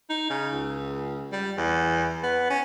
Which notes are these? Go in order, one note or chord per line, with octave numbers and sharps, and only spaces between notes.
D#4
C#3
C#2
G3
E2
B3
C#4